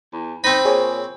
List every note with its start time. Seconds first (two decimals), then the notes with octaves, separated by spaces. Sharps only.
0.12 E2
0.44 C4 D#4 C5 B5
0.65 A#2 G#4 C#5